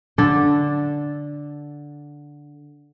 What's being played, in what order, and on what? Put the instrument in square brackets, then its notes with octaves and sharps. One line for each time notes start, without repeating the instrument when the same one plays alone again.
[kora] D3 D4 A4